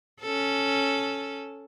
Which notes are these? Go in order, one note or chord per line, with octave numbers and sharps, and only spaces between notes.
C#4 A4